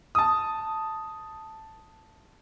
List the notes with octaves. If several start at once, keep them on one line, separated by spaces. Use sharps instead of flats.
A5 D#6